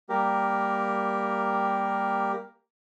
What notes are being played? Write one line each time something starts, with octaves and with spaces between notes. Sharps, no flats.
G3 A#3 G4 A#4